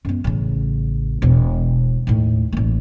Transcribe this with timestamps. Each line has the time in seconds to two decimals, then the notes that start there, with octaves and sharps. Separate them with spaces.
0.05 F#2 B3
0.24 A1 C#3
1.22 E1 B2
2.07 D#2 A2
2.52 A1 A#3